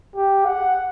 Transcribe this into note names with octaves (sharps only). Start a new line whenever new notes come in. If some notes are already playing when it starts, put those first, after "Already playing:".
G4
F#5